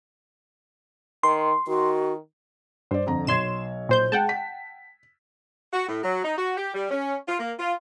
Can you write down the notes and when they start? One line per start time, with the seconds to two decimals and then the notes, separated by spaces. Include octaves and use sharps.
1.23 D#3 C6
1.67 D#3 F#4
2.91 G2 C5 D5
3.07 F2 D3 A#5
3.27 B1 C#5 C6 G#6 E7
3.89 A#2 C5 G6
4.12 G#3 F#5 G5 A5
4.29 B6
5.73 F#4
5.88 A2
6.03 F#3
6.24 D#4
6.38 F#4
6.56 G4
6.74 G3
6.90 C#4
7.28 F4
7.39 A#3
7.58 F4